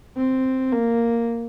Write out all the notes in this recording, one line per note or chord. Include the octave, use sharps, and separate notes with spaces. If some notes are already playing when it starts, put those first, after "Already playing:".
C4
A#3